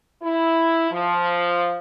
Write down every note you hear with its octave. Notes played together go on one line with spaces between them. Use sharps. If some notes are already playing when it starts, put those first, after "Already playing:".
E4
F3